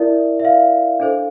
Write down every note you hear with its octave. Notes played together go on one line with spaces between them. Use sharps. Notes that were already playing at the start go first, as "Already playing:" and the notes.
Already playing: E4 A#4 D5 E5
E5
F5
D4 A4 C5